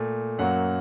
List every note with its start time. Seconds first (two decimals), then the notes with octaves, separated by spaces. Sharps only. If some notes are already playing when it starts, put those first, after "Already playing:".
Already playing: A#2 A3
0.39 F#2 F#3 A#3 F#5